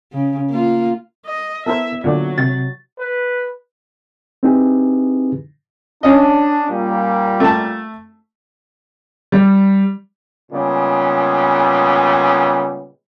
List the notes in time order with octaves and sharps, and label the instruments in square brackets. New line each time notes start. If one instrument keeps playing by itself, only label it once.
[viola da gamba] C#3
A#3 F4
[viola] D#5
[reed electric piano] B3 E4 [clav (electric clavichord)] A4 A#4 C5 [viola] E5
[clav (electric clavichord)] A#2 D3 D5 [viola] F#3
[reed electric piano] C3 [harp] A6
[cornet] B4
[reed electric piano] C4 D#4 E4 G4 G#4 B4
[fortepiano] C#4 D#5 [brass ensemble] D4
[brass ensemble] A#2 G3 A#3
[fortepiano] A3 A5
[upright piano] G3
[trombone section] A#2 C#3 G3 G#3 B3